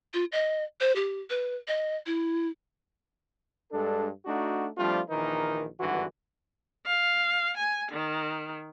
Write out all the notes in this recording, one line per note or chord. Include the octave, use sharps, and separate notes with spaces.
F4
D#5
C5
G4
B4
D#5
E4
G2 G#3 D4 A4
A3 D4 D#4 F#4
F3 G3 A3 C4 D4 F4
A#1 D#3 E3 D#4 A#4
G#1 G2 D3 E3 F#4
F5
G#5
D#3